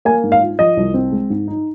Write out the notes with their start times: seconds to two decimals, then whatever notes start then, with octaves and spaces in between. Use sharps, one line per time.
0.05 A#3 G#5
0.24 G#2
0.32 F5
0.41 F4
0.59 F3 D#5
0.77 C2
0.94 C4
1.12 G#3
1.30 G#2
1.48 D#4